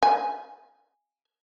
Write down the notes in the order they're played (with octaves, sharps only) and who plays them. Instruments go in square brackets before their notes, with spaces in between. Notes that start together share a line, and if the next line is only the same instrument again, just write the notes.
[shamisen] G#5